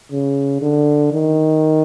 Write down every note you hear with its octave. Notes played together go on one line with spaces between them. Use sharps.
C#3
D3
D#3